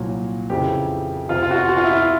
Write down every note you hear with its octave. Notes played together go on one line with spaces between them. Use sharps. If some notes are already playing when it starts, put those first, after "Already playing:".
Already playing: C2 A#2 F#3
F2 C#3 E3 G4
F2 C3 F3 F4
F4
F#4
F4
F#4
F4
E4
F4